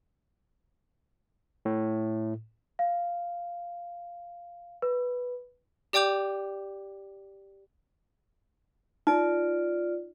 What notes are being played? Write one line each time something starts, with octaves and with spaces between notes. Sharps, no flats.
A2
F5
B4
G4 D5 G5 D6 G6 F7
D#4 F4 D5